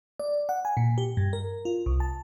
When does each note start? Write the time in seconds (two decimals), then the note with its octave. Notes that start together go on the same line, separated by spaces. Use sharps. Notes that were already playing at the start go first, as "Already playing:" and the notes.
0.20 D5
0.49 F#5
0.65 G#5
0.77 A#2
0.98 G4
1.17 G2
1.33 A#4
1.65 F4
1.86 C2
2.00 A5